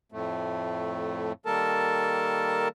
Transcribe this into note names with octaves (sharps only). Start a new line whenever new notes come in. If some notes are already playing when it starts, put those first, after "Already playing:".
F2 A2 A3
D#3 G3 A#3 A4 A#4 A5